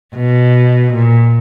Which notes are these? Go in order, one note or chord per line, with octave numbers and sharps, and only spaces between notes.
B2
A#2